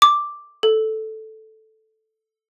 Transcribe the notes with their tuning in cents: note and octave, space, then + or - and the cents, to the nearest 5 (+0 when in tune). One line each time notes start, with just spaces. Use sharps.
D6 +0
A4 -5